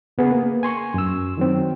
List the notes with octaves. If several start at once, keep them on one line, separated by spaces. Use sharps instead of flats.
C#3 B3 G#4 B4
A#3
G#5 C6 C#6
F#2 E6
D#3 F#3 C4